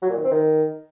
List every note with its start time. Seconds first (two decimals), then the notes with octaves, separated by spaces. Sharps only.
0.02 F#3
0.10 A#2
0.17 D#3
0.24 C4
0.32 D#3